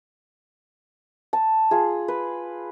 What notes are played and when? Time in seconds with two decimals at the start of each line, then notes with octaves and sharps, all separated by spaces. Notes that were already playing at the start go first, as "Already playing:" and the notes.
1.33 A5
1.71 F4 G#4
2.08 B4